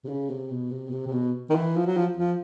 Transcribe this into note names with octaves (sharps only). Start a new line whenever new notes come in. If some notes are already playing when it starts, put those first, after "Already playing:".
C3
C#3
C3
B2
C3
B2
C3
C3
B2
D#3
E3
F3
F#3
F3
F3